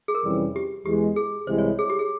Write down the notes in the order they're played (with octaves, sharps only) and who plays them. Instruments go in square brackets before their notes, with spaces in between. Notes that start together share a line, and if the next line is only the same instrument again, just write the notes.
[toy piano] G#4
A#4
[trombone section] F2 C3 E3 G3 C#4
[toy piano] G4
[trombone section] E2 E3 G#3 [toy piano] G4
[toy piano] G#4
[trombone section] C2 C3 E3 G#3 E4 [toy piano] C5
[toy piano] C#5
G#4
G4
G#4